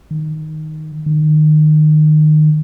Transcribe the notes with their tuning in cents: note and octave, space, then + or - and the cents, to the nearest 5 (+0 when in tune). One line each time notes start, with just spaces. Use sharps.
D#3 +0
D#3 -25